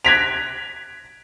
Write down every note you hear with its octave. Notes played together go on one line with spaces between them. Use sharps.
F#6 G#6 A#6 B6 D7 F7